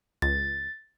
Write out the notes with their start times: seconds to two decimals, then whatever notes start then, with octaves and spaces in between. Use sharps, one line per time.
0.22 C#2 A6